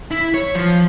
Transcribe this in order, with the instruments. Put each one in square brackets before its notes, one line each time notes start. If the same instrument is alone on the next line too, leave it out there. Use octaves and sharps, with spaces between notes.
[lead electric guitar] E4
C#5
F3